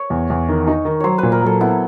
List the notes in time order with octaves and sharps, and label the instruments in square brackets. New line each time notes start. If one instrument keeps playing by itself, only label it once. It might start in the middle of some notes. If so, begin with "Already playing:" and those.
Already playing: [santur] C#5
[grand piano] E2
E2
D#3
D#4
D#3
[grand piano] F#3 [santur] C5 C#5
[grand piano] A#2 [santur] B4
[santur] A#4
[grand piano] F#3 [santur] A4
[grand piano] B3 [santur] E4